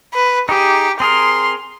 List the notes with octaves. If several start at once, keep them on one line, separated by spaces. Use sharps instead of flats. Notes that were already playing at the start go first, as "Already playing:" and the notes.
B4
D#4 G4 G#4
C4 G#4 A#4 C6